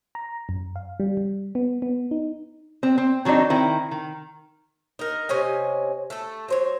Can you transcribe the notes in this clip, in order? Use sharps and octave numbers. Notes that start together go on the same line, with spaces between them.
A#5
F#2
F5
G3
G3
B3
B3
D#4
C4
C4
D#3 F#3 C4 D4 D#4
D#3 C4 E4
D#3
D#4 A#4
C3 C#4 D#5 G#5
A3 A4
F#3 C5 C#5